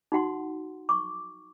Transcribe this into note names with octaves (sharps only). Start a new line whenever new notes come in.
D#4 F#4 F#5 C6
C#6 D6